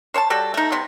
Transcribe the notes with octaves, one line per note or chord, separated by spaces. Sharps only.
C5 C#5 G5 A5
G3 F#4 A4
A3 D#4
C3 B3 C6